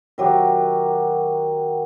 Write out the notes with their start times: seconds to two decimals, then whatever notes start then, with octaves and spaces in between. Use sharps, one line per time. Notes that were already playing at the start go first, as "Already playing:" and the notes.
0.18 D#3 F#3 G4